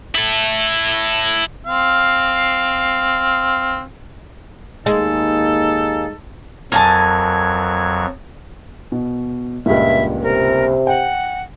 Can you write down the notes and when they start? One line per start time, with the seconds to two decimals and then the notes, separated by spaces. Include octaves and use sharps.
0.15 E4 A4
1.65 C4 F5
4.86 D#2 G#3 A#3 D#4 G#4 A4
6.72 F2 F#3 A#4 G#5 A5 G#6
8.92 B2
9.66 C#2 G2 A#2 E5
10.22 C3 A#4
10.87 F#5 G5